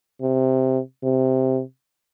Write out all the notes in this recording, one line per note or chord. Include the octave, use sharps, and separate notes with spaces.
C3
C3